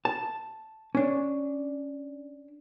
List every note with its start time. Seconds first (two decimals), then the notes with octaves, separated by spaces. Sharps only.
0.05 A5
0.95 C#4 D4